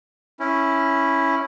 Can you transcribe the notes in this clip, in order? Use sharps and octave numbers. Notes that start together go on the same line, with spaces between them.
C#4 E4